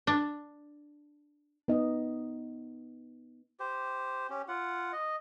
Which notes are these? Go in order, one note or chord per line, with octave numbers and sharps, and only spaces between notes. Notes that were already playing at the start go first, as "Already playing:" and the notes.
D4
B3 D#4 D#5
G4 C5
C#4 G4
F4 F#5
D#5